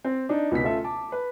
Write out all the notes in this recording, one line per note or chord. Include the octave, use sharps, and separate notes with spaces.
C4
D4 D#4
C#2 B2 D#4 B6
A3 C#4 F4 A4 E5
A5 D6
B4